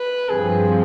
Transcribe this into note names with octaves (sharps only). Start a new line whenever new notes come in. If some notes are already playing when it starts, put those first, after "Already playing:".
Already playing: B4
G2 F3 C4 G#4